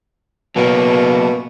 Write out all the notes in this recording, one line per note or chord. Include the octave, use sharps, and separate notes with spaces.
B2 F#3 A#3